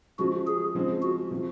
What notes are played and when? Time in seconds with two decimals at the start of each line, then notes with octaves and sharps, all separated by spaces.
0.19 C#3 F3 G#3 F#4
0.47 G#4
0.75 C#3 F3 G#3 C4
1.03 F#4
1.31 C3 F3 C4